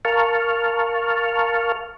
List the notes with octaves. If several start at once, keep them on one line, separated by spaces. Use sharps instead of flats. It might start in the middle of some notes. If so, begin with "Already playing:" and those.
A#4 F5 A5 C#6 F6